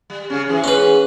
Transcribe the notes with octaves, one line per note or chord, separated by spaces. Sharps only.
G3
C#3 C#4
G#2 E3 G#4
C#4 B4